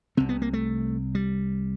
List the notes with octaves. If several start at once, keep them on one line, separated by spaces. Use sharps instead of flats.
C2 C3 C4
B3
A#3
A3
G3